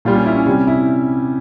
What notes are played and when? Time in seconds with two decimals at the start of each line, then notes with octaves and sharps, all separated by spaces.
0.05 A#2 G3 F4
0.15 C#4
0.26 E4
0.36 C#4
0.46 C3 G3 C#4
0.67 E4